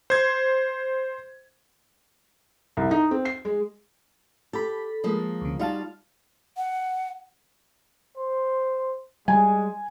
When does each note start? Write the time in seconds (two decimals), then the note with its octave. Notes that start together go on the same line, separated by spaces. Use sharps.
0.10 C5 G#6
2.77 C2
2.91 D#4
3.11 C4
3.25 C7
3.45 G#3
4.53 G4 A4 B5
5.04 F3 G#3 A#3
5.41 D2 C#3
5.59 G3 D#4 F4 F#4 F5 A5
6.57 F#5
8.17 C5
9.28 G3 G#3 G#5